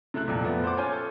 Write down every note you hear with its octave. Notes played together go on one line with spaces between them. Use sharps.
C3 A3 E4 F#6
F2 A#2
A#2 F3 A3 B3
C5 F#5 D6
C#4 F4 C#5 G#5 G6
A4